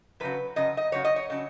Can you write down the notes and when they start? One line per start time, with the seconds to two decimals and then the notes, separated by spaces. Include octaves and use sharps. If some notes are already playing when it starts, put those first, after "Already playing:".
0.20 F#2 C#3 F#3 B4
0.56 F#2 C#3 F#3 D#5
0.77 D#5
0.92 F#2 C#3 F#3 C#5
1.05 D#5
1.16 C#5
1.30 C#3 F#3